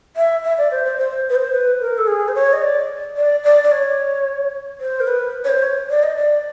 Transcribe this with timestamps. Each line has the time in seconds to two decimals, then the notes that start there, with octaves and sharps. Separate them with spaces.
0.16 E5
0.44 E5
0.58 D5
0.71 C5
0.85 C5
0.98 C5
1.30 B4
1.36 C5
1.53 B4
1.81 A#4
1.98 A4
2.07 G#4
2.28 C5
2.35 C#5
2.53 D#5
2.62 D5
3.17 D5
3.44 D5
3.63 D5
3.72 C#5
4.81 C5
5.00 A#4
5.08 B4
5.44 C#5
5.49 C5
5.62 C#5
5.90 D5
6.03 D#5
6.16 D5